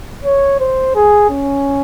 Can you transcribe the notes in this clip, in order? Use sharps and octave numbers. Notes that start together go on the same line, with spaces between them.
C#5
C5
G#4
C#4